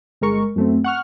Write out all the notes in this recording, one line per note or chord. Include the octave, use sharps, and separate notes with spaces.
G1 G#3 A#4 C#6
F#2 A3 C4
F#5 C#6 F6